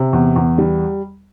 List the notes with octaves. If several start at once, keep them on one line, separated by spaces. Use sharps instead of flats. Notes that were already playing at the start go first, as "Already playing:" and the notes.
Already playing: C3
E2
E2
G3